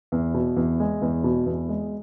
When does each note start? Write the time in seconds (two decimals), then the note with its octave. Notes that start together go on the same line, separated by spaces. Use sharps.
0.12 E2
0.34 B2
0.56 E2
0.80 G#3
1.02 E2
1.24 B2
1.46 E2
1.69 G#3